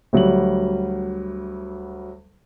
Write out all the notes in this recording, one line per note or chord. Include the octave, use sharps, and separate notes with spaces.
D2 F#3 G3 F#7